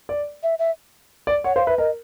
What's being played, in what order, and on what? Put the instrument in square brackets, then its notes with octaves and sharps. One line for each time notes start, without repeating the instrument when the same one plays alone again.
[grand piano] D5
[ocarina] E5
E5
[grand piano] D5
[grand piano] C#5 [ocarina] F#5
[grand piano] C5 [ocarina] F5
[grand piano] B4 [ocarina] E5
[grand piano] A#4 [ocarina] D#5